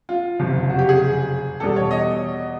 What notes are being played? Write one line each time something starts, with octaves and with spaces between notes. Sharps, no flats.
F4
F#1 F2 C3
F#4
G4
G#4
E2 B2 G3 A4
C#5
D#5